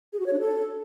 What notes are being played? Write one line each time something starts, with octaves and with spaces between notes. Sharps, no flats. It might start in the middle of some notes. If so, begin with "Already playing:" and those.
G#4
F#4
C#5
D4
A4